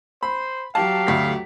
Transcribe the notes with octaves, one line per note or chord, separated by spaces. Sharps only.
C5 B5
F#3 G4 F5 A5
D2 A3 B6